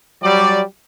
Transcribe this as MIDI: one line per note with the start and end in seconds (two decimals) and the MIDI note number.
0.22 0.61 54
0.22 0.61 55
0.22 0.60 74